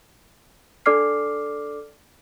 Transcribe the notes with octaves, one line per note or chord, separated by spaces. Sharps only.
D4 A4 D5 D6 F6 C7